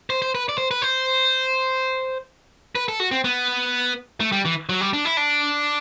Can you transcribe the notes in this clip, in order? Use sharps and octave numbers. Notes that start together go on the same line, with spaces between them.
C5
C5
B4
D5
C5
B4
C5
B4
A4
F#4
C4
B3
A3
G3
E3
F#3
G3
D4
E4
D4